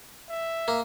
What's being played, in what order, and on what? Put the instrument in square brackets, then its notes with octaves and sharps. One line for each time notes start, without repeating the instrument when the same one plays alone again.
[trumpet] E5
[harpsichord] A#3